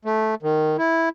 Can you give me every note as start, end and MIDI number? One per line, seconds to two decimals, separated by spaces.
0.05 0.35 57
0.42 0.77 51
0.78 1.09 64